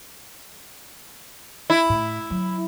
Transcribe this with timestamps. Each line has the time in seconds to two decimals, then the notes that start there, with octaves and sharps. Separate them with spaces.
1.70 E4
1.89 A2
2.30 F#3